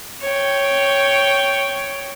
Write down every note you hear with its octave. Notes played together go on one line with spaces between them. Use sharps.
C#5 G5